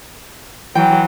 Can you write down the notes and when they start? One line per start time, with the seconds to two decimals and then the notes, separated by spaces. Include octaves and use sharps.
0.75 E3 F#3 G5